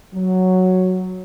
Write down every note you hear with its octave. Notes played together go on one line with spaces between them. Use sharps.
F#3